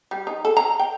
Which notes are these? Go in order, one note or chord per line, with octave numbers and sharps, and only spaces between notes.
G3
D#4
A4
A#5
G5